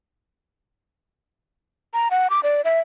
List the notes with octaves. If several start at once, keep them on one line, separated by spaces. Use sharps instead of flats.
A#5
F#5
D6
D5
E5